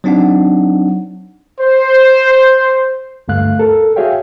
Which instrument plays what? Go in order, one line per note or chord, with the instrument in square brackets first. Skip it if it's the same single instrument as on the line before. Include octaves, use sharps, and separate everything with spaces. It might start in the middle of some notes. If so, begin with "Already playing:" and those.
[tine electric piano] F#3 C4 D4 D#4 F#5
[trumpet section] C5
[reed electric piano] D2 G2 A3 F5 F#6
A4 A#4
F#4 G#4 C#5 E5 F5 G5